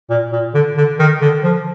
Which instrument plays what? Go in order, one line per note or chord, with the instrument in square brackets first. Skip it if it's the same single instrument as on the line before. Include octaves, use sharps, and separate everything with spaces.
[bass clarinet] A#2
A#2
D3
D3
D#3
D3
F3